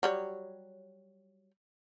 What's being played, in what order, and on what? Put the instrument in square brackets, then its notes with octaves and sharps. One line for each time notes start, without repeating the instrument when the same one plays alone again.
[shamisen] F#3 G3 C#5